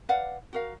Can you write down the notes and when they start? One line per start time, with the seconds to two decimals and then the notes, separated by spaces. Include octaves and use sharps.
0.09 B4 D5 F5 F#5
0.53 F#4 A#4 F5